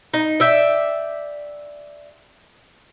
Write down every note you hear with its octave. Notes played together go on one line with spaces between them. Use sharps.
D#4
D5 E5 G5